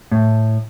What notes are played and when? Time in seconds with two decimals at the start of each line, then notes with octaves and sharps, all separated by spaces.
0.11 A2